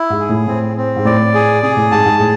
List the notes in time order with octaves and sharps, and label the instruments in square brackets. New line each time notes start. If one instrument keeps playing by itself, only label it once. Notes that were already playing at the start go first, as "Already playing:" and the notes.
Already playing: [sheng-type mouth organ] E4
[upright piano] G#2
[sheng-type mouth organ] G#4
[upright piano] A2
[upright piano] A2 [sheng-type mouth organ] C4
[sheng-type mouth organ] C4
[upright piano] G#2
[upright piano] A2 [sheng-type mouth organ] D5
[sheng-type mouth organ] G#4
[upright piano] C3 [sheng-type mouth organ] G#4
[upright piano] A2
[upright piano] G#2 [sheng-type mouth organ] A5
[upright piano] G#2
[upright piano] A2 [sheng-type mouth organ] G#4